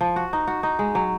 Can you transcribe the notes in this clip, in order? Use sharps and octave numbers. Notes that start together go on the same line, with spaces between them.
F3
F#4
D#4
F#4
D#4
G#3
F#3